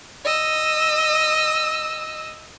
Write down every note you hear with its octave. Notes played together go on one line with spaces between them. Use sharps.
D#5 E6